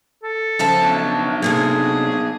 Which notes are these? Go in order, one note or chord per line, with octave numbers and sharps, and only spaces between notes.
A4
C#3 F3 E5 A5
B2 F#3 D4
C3 A#3 D4 G#4 A4